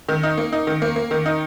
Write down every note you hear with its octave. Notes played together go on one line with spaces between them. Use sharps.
D#3
D#4
A#3
D#4
D#3
A#3
A#3
D#3
D#4